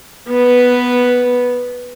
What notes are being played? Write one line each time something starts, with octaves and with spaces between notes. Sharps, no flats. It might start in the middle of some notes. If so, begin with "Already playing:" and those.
B3 B4